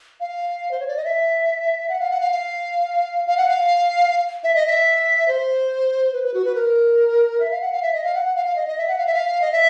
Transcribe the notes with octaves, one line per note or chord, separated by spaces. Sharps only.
F5
C5
C#5
D5
D#5
E5
F#5
F5
F#5
F5
F5
F5
F#5
F5
E5
D#5
E5
C5
B4
B4
F#4
B4
A#4
E5
F5
F#5
F5
E5
D#5
F5
F#5
F#5
F5
F5
D#5
D#5
E5
F#5
F5
E5
F5
D#5
E5